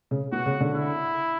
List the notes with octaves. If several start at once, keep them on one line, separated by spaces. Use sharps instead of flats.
C#3
B2 F#4
C#3
D3
E4